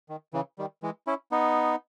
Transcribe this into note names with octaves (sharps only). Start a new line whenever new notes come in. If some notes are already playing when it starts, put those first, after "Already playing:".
D#3
C#3 E3
D#3 G3
E3 G#3
C#4 E4
B3 D#4